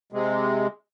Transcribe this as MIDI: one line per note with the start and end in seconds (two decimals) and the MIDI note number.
0.13 0.67 48
0.13 0.67 56